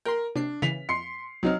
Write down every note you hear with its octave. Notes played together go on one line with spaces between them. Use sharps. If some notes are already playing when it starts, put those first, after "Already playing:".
A#4 G5 C6
C3 D4 C7
C#3 E3 B6 C7 F7
F2 C6 C7 C#7
C2 F#3 C4 D#4 F6